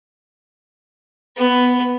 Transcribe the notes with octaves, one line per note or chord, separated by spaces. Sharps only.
B3